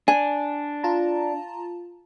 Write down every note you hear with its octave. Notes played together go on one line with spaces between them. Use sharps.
D4 G#5
F4 A5 A#5